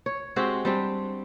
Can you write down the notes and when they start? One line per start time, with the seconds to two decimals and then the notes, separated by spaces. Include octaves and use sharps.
0.06 C#5
0.36 G#3 C4 F#4 G4
0.65 G3 C4 D4